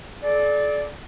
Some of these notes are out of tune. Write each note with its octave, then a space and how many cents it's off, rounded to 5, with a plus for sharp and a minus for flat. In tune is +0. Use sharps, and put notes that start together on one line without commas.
A4 -45 D5 +0